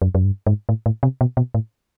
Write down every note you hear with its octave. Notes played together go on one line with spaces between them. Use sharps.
F#2
F#2
G2
G#2
A2
A2
C3
B2
B2
A2